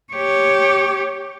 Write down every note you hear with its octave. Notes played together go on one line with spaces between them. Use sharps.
G4 C#5